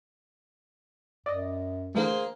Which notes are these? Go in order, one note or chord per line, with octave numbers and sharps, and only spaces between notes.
F#2 D5 D#5
D3 E3 A3 A#3 G#4 C5